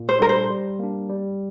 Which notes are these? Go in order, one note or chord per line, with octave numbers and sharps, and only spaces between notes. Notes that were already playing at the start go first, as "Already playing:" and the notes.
Already playing: A#2
C5
G3 D4 A4 A#4
C5
G3
A#3 D4
G3